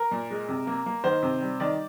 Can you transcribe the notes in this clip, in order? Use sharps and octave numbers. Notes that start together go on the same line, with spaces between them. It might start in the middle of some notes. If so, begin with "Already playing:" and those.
Already playing: A#4
A#2
G#3
C3
A#3
A#3
D#3 C5
C3
G3
D#3 D5